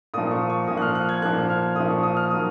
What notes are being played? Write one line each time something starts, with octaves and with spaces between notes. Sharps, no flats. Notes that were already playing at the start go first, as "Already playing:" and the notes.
A#2 F3 D#6
C#6
C#6
A#2 F3 D#6
F#6
F6
F#6
G#6
A#2 F3 F#6
F6
A#2 F3 D#6
C#6
D#6
F6
D#3 F#3 D#6